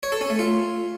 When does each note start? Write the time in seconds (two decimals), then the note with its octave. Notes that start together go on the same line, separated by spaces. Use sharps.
0.03 C#5
0.12 A4
0.21 C#4
0.30 A3
0.39 F4